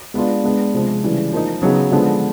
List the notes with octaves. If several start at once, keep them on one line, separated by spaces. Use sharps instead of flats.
G#3 B3 D4 F4
G#3 B3 D4
C3 F3 G#3
C#3 E3 G3
F3 A#3 D#4
C#3 F#3 B3 D#4 G#4
D3 F3 G#3 B3